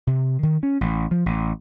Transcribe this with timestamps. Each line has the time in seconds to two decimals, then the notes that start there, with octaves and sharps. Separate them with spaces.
0.07 C3
0.43 D#3
0.63 C#4
0.81 A1
1.11 F3
1.26 A1